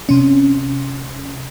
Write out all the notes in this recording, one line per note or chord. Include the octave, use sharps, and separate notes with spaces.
C3 C#4